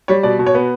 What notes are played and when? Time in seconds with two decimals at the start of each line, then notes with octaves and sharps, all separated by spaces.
0.08 G3 C#5
0.23 B2 D5
0.39 B2
0.47 C#5
0.55 B3